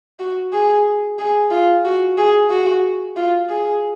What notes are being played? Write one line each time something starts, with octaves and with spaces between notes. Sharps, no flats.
F#4
G#4
G#4
F4
F#4
G#4
F#4
F4
G#4